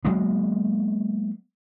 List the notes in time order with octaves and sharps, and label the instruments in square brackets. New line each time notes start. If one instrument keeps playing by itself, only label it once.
[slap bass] F#3 G#3 A#3 B3